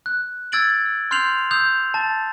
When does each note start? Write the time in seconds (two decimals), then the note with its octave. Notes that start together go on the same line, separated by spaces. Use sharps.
0.06 F#6
0.52 E6 G#6 A6 D7 F#7
1.11 C6 F6 G6 C7 F7 F#7
1.51 D#6 E6 G6 C7 F7
1.94 A5 A6